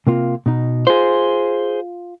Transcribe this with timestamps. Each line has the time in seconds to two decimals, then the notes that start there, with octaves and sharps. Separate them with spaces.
0.07 C3 A#3 F4
0.46 B2 D#4
0.87 F4 G#4 C5